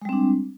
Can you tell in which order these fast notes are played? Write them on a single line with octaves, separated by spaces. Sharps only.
G#3 G3 C4 D4